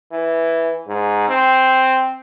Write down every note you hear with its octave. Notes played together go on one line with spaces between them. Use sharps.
E3
G#2
C4